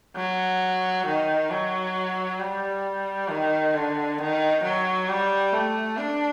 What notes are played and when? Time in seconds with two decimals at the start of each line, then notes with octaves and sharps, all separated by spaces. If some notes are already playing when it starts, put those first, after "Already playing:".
0.16 F#3
1.07 D#3
1.50 F#3
2.40 G3
3.29 D#3
3.74 D3
4.19 D#3
4.63 F#3
5.08 G3
5.53 A3
5.98 D4